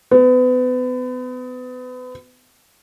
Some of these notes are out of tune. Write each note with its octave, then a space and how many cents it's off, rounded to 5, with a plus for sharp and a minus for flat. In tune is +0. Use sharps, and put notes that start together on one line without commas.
B3 +35